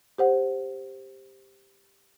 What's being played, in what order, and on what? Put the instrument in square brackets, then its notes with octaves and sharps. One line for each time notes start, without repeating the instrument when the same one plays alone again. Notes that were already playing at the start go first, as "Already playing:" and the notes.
[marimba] G4 C5 F#5